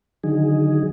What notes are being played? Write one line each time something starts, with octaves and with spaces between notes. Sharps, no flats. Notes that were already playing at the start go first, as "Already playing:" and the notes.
D3 D#3 F#3 D#4 G#4